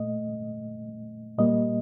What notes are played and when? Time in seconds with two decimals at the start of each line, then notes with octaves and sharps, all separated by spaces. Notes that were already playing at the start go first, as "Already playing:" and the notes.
Already playing: A#2 A3 D#5
1.38 A#2 G3 A#3 D#5